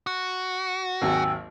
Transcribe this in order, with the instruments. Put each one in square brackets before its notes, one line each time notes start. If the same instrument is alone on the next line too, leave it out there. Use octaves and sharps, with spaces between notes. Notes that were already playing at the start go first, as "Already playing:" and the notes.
[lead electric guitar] F#4
[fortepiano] G#1 D#2 F#3 [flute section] G5 G#5 E6